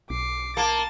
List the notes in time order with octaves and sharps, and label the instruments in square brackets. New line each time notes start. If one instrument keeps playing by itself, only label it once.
[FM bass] B1 [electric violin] D6 C7
[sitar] A#3 [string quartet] A5 [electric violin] A6